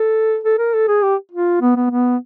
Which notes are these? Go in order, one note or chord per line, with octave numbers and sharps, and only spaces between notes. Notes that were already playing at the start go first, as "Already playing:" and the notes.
Already playing: A4
A4
A#4
A4
G#4
G4
F4
B3
B3
B3